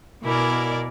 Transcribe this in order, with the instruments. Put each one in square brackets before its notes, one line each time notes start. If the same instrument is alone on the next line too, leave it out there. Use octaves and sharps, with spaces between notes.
[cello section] B2 A#4 D5 [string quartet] E4 G#5